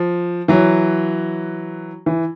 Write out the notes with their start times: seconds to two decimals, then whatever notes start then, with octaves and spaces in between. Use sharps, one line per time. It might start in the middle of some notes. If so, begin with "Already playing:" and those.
Already playing: F3
0.48 E3 F#3
2.06 E3